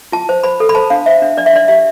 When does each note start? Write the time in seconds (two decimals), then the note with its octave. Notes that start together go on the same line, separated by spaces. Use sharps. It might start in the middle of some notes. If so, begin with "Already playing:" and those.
0.12 F4 A5
0.29 C5
0.43 C5 B5
0.60 A4
0.69 B5
0.75 C5 A5
0.90 D4 F5
1.06 C5 E5
1.22 D4
1.37 D4 D5
1.46 E5
1.53 D4 D5
1.68 G4 E5